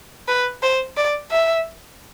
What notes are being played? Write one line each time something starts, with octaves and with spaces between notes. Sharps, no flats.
B4
C5
D5
E5